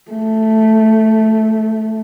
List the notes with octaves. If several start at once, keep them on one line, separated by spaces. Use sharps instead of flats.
A3